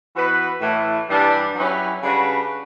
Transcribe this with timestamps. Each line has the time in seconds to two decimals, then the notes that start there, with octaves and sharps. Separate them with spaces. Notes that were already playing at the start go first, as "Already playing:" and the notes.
0.15 E3 B3 F#4 B4
0.61 A2 E3 A3
1.09 G2 E3 G3 D4
1.55 F#3 C#4 E4 G4 B4
2.03 C#3 G3 D4 F#4 B4